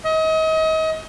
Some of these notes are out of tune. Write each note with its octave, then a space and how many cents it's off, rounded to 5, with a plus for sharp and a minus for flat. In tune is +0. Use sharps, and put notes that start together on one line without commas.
D#5 +35